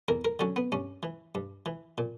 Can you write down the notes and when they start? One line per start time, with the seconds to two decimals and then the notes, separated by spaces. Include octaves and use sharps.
0.08 E2 A#4
0.25 A#4
0.39 D3 F#3 C#4
0.56 B3
0.72 G2 C#4
1.03 E3
1.35 G2
1.66 E3
1.98 A#2